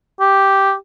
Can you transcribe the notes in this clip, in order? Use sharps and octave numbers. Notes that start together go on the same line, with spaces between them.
G4